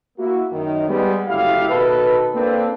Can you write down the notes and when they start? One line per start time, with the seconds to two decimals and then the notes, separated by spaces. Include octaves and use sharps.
0.18 A#3 E4 F#4
0.52 F#2 D#3
0.88 G3 G#3 B3
1.27 F#1 D3 A3 E4 G4 F5
1.70 B2 D#3 B3 A4 B4
2.34 A#3 C4 D4 E4 A4 B4